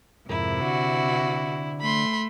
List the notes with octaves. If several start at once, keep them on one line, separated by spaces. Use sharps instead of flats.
F2 G#2 C3 E4 A#4
D3 F#4
A3 B5 C6